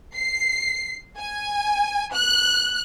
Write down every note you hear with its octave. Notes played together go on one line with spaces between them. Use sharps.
C7
G#5
F#6